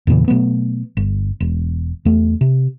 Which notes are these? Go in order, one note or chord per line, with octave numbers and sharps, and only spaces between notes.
E2 A#2 C#3 E3
B2 F#3 A3 B3
G1
E1
E2 A3
C3